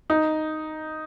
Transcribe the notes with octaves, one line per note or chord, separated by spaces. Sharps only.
D#4